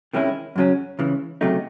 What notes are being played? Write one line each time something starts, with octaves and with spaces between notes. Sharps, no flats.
C3 D#3 G#3 C#4 E4
F#2 C#3 F#3 C#4
C#2 C#3 E3
C#2 C3 F#3 A3 D#4